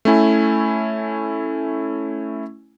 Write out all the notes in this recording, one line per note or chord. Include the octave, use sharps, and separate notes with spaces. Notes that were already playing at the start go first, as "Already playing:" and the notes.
A3 C#4 E4 G#5